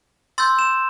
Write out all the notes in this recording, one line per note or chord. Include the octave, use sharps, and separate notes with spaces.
C6 E6 G6 A6
E7